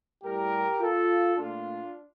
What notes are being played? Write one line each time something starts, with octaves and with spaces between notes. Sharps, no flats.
A2 G3 G4 A#4
F4 A4
A#2 A3 D4 F4